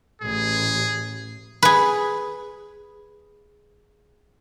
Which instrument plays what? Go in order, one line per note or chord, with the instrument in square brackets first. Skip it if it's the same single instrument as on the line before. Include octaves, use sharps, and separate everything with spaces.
[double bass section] A1 [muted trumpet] G#4
[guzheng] G#4 B4